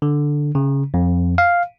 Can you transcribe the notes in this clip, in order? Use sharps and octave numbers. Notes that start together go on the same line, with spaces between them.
D3
C#3
F2
F5